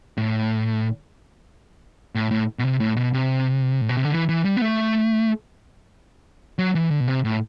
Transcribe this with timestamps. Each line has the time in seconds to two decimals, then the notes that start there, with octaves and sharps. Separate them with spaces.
0.17 A2
2.15 A2
2.31 A2
2.59 B2
2.64 C3
2.80 A2
2.97 B2
3.13 C3
3.81 A2
3.89 B2
3.97 C3
4.05 D3
4.12 E3
4.29 E3
4.45 G3
4.57 B3
4.61 A3
6.59 F#3
6.75 E3
6.91 D3
7.00 B2
7.08 C3
7.25 A2